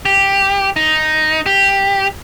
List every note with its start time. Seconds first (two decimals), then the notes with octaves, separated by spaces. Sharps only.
0.05 G4
0.76 D#4
1.46 G4